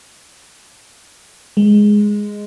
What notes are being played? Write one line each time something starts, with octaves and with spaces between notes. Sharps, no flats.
G#3